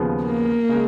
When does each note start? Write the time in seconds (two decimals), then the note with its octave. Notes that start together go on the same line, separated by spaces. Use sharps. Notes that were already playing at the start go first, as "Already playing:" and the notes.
Already playing: D#2 C#3 F3 B3
0.24 A#3
0.69 C#3 G#3